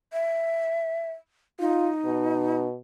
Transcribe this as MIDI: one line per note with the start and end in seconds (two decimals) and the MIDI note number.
0.13 1.10 76
1.60 2.65 63
1.60 1.89 65
2.06 2.76 47